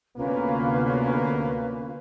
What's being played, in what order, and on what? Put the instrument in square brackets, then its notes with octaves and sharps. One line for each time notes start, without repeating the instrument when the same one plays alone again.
[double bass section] D2 C3 B3 [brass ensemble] A#3 [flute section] C#4 F4 B4